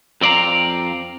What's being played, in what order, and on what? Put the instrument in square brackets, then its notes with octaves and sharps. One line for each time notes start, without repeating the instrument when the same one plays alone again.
[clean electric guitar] F2 C4 D5 F5 A#5